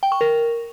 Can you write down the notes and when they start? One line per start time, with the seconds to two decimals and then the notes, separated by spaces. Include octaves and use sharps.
0.03 G5
0.12 C#6
0.21 A#4